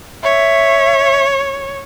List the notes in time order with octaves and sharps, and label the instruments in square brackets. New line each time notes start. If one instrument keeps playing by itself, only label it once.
[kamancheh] C#5 [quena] E5